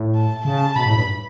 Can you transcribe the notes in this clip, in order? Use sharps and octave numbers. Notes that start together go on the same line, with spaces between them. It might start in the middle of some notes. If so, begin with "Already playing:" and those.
Already playing: A2
A5
C#3 A5
B2 B5
A2
G2